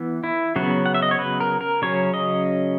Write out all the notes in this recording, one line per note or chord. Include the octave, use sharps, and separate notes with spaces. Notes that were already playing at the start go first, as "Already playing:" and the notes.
Already playing: E3 B3
E4
C#3 F#3 B3 F#4
F#5
E5
D#5
C#5
B4
A#4
A#4
C#3 F#3 C#4 C#5
D#5